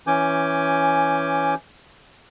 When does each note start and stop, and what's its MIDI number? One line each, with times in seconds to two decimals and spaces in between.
0.07 1.54 52
0.07 1.54 61
0.07 1.54 80
0.07 1.54 86
0.07 1.54 91